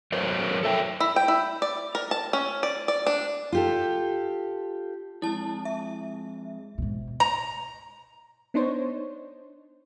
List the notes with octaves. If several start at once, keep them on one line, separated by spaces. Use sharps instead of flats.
F#3 A#4 C5 C#5
A4 E5 G5
E4
G5
E4
D5
A#4
A5
C#4
D5
D5
D4
F4 G4 A4
F2 G#3 E4 A5
E5
G#2 B2
A#5
B3 D4 D#4 C5 C#5